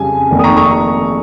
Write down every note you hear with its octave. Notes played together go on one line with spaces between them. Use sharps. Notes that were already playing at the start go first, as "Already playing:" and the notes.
Already playing: F2 C#3 G3 G#5
F1 F2 D#3 A#3
D#6
A#5 C#6
A#5 C#6